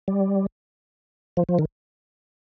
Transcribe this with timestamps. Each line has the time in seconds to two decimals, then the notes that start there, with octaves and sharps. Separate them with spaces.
0.08 G3
1.37 F3
1.49 F3
1.59 D#3